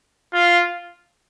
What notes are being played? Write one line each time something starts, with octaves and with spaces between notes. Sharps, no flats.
F4